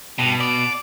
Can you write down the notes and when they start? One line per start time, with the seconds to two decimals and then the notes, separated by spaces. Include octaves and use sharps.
0.18 G2 B2
0.40 D5